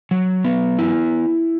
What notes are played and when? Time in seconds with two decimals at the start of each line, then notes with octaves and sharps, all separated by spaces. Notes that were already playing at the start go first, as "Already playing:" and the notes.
0.11 F#3
0.44 B3
0.79 E4